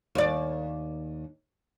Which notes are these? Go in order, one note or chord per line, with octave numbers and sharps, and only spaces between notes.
D#2 D5